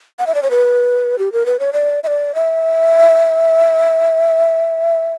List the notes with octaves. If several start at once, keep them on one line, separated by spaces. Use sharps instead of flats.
F#5
E5
D5
C#5
B4
G4
A#4
B4
C#5
D5
E5
D5
E5